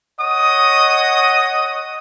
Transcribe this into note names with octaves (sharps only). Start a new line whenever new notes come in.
C#5 D#5 F#5 D#6